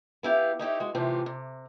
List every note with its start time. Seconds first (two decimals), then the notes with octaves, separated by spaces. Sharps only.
0.23 B3 E4 G4 F5
0.59 D#4 E4 G4 C#5
0.80 G#3 F#4
0.95 A2 C3 E3 F4 G4 C#5
1.26 C3